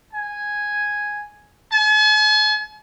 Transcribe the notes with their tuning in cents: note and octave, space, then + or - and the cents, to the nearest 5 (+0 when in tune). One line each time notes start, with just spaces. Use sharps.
G#5 +0
G#5 +45